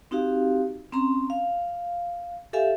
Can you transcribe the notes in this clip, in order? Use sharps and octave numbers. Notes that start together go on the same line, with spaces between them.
C4 D#4 F#4 G4 F5
C4 C#4 A#5 C6
F5
G4 A4 E5 F5 G#5